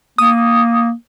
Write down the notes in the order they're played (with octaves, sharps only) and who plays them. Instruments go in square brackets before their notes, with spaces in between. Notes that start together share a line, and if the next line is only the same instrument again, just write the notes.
[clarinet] A#3 [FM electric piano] D#6